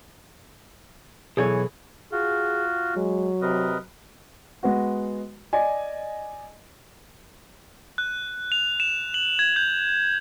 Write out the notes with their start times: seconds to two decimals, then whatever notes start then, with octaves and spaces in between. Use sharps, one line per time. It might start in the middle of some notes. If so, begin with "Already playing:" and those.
1.37 B1 B2 E3 G#4 A4 C#5
2.12 F4 F#4 G#4
2.96 F#3 G#3
3.42 C3 A#4 B4 D#5
4.63 G#3 B3 F#4
5.53 D5 D#5 G#5
7.98 F#6
8.52 F7
8.80 E7
9.14 F#7
9.39 G#6
9.56 G6